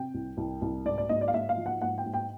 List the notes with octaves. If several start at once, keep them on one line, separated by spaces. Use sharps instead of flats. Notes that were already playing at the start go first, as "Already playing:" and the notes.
Already playing: C3 G5
C2
C2
C2
G#2 D5
D5
G#2 D#5
D5
F5
G#2 E5
F5
F3
F#5
G#2 F#5
G5
G#2
G5